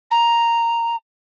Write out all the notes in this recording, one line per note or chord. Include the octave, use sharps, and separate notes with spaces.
A#5